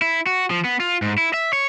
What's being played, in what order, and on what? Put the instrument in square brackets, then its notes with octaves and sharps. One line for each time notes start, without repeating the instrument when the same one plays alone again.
[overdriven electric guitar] E4
F#4
F3
B3
F4
G#2
E4
E5
C#5